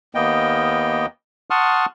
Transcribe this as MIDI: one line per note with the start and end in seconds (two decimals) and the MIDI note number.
0.15 1.06 39
0.15 1.06 58
0.15 1.06 59
0.15 1.06 75
0.15 1.06 79
1.50 1.86 78
1.50 1.86 81
1.50 1.86 84
1.50 1.86 85
1.50 1.86 87
1.50 1.86 89